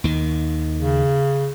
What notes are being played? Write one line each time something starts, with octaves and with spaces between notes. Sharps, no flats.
D#2 D#3
C#3